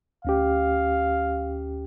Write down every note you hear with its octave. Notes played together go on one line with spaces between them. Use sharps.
D2 C#4 G4 F5